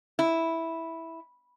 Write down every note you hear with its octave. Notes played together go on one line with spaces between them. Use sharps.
E4